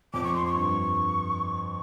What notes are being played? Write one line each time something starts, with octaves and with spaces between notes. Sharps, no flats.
F2 D6
C#6
C6
C#6
G2